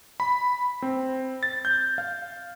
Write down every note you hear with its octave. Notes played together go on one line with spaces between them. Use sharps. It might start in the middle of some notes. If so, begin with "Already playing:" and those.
B5
C4
A6
G6
F5